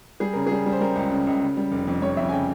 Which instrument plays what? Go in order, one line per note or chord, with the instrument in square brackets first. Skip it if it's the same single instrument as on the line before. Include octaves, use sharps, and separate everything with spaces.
[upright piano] G3 G#4
C#3 A#4
G3 G#4
G3
C5
G3 A#4
C#2
C#3
C#2
C#3
G3
F1
F2
G3 C#5
F2 E5
G#5
C#3 G5